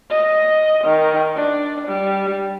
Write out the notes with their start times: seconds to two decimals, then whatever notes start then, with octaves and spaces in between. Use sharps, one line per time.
0.10 D#5
0.84 D#3
1.36 D4
1.88 G3